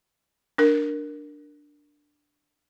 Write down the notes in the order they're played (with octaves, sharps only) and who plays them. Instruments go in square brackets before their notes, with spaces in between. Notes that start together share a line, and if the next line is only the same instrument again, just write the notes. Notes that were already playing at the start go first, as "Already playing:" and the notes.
[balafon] D4 A#4